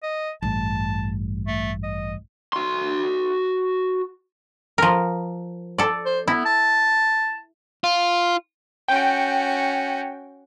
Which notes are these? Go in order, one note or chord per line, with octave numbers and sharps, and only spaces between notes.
D#5
A1 G2 A5
A3
D#5
F#4 C6
F3 A#4
A4 D5
C5
B3 E4
A5
F4
C#4 F#4 G5